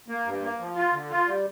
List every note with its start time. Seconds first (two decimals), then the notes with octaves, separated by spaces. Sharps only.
0.08 A#3
0.26 G2
0.42 A#3
0.59 F3
0.75 F4
0.93 D3
1.10 F4
1.26 G3